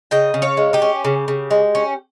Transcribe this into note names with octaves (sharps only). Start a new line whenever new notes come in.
C#3 D#5 G5
C#3
C#5 F5
G#3
D#4 G4
C#4
C#3
C#3
G#3
C#4